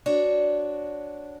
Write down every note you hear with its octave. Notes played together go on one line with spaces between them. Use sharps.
D4 F#4 C#5